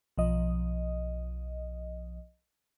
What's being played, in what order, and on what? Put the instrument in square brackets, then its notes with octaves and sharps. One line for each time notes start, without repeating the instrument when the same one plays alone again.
[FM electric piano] B1 F3 D#5